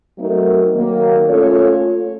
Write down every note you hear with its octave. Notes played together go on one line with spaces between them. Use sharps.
F#3 A3 C4 D#4 A#4
D#3 F#3 A#3
A3 C#4 F4 A4 C#5